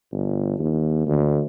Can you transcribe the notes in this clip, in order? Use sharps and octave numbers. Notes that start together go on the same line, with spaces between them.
G1
D#2
D2